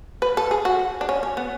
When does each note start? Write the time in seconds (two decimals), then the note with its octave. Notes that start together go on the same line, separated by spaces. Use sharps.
0.22 B4
0.37 A4
0.51 G#4
0.65 F#4
1.01 D4
1.09 C#4
1.23 C#4
1.37 B3